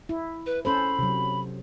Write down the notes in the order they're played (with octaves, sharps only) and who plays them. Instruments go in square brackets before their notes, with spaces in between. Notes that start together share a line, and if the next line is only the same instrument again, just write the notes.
[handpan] E4
[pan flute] B4
[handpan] C#4 A4 C5 [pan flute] B5
[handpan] C3 F#3